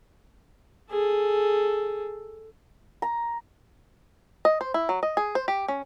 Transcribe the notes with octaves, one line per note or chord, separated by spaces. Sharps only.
G#4 A4
A#5
D#5
C5
E4
F#3
D#5
G#4
C5
G4
C#4